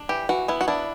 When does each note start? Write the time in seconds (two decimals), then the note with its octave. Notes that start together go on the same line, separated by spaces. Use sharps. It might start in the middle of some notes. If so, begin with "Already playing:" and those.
Already playing: D4
0.09 E3 G4
0.29 E3 F#4
0.48 B3 E4
0.61 F#4
0.68 D4 E4